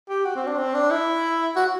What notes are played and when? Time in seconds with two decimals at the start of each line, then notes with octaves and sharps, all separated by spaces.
0.09 G4
0.25 F#4
0.36 C4
0.47 D4
0.58 C4
0.74 D4
0.91 E4
1.56 F#4